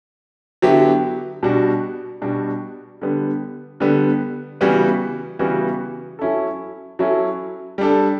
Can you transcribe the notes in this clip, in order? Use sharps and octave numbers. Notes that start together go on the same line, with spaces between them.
D3 F#3 B3 E4 G4
B2 G3 D4 F#4
B2 G3 D4 F#4
D3 G3 B3
D3 G3 B3
C#3 E3 G3 B3 F#4
C#3 E3 G3 B3 F#4
F#3 C#4 E4 A4
F#3 C#4 E4 A4
G3 D4 A4